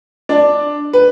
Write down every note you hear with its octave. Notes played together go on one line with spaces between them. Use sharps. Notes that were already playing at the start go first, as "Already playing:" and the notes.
D4 D5
B4